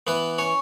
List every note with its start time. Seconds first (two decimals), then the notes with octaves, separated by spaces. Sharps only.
0.07 E3 B3 B4
0.38 C#4 C#5